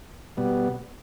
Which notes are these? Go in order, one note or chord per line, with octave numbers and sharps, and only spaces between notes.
B2 G3 B3